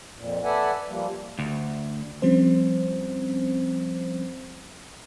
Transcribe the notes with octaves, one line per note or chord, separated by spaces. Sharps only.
F2 A#2
A4 B4 D5 E5 F#5 G#5
F3 G3 A#3
D2
F3 G3 C4 C#4 C5